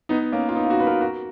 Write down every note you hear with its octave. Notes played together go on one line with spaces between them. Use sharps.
B3 D#4
A#3 C#4
F4
B3 D#4
F4
D#4 F#4
B4
F#4 A#4
F#4 A#4